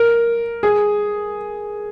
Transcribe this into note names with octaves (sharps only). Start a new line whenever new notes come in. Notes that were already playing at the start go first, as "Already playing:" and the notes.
Already playing: A#4
G#4